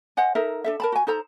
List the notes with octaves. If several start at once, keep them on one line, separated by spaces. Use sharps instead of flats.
C5 D#5 F#5 G#5
D#4 A4 A#4 E5
D4 A4 E5
A#4 A5 B5
F#4 G#5
D#4 A4 C5 A#5